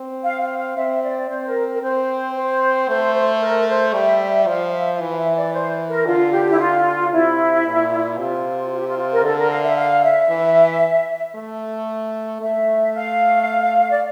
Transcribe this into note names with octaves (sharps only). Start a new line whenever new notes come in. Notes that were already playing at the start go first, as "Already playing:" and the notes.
Already playing: C4
F5
F5
F5
C4 E5
D5
C4 C5
A#4
A#4
C4 C5
C5
A3 C5
C5
A#4
C5
G3 E5
F3 F5
F5
E5
E3
F5
E5
D5
C5
A#4
D3 F4
G4
E4
F4
C3 E4
A#2
C3 F4
F4
G4
F4
F4
A#4
D3 A4
A#4
F5
E5
F5
E5
E3
A3
A3 E5
F5
D5